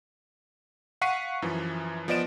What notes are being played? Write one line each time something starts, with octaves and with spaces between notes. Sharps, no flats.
F5 F#5 C#6 B6 C7 D#7
F#2 E3 F3
F3 B3 D5 D#5 D7 E7